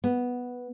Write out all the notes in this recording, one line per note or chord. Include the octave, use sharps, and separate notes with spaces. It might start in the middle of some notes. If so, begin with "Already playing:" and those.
B3